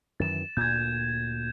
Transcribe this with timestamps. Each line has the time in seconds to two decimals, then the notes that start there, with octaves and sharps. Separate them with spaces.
0.20 F#2 D#3 E3 A6 E7
0.57 D2 A#2 G6 G#6